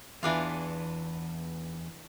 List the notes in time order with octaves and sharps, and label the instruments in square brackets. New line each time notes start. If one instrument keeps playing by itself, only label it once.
[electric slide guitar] E2 B3 [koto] E3 D4 F4